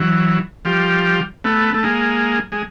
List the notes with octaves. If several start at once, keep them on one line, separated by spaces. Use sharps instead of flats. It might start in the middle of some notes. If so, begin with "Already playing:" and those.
Already playing: E3 F#3
F3 G3
A3 B3
A3
G#3 A#3
G#3